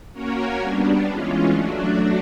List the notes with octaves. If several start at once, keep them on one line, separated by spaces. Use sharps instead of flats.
A#3 C#4 F#4 A#4 C#5
G3 B3 D4
E3 G#3 C#4 F4
F#3 A3 D4 F#4